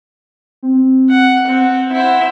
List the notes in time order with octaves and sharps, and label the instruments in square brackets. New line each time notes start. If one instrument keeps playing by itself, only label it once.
[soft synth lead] C4
[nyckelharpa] F#5
[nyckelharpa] C4 [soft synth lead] F#5
[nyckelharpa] E4 C5